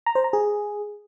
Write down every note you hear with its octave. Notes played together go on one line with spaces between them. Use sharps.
A#5
C5
A#5
G#4